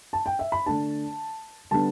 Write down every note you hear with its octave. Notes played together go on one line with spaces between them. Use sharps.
A5
G5
E5
B5
D3 A3 D4 A5
D3 G3 B3 D4 A5